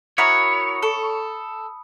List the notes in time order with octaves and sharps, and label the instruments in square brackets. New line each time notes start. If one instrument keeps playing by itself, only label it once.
[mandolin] E4 F#4 A#4 [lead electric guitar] C#5 [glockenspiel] B5 D#6 C#7
[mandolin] A4